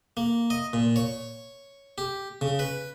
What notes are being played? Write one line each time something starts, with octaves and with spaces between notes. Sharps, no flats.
A#3
D#5
A#2
C#5
G4
C#3
B4